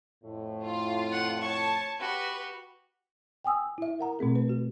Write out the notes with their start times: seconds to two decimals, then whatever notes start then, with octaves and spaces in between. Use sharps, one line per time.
0.24 F2 A2
0.64 F4
1.12 F#5
1.41 C#5 A5 C#6
2.00 F#4 G4 B4
3.44 G5 G#5 D#6 E6
3.78 E4 E5
3.99 A#4 F#5 A#5
4.19 B2 A3 C4 G#4
4.36 B4
4.49 F#4